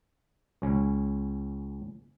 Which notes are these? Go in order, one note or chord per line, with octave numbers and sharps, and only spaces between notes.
C#2 C#4